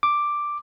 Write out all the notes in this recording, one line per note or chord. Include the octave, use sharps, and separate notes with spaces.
D6